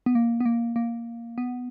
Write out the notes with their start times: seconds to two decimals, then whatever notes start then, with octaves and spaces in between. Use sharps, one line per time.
0.06 B3
0.15 A#3
0.40 B3
0.46 A#3
0.76 A#3
1.38 B3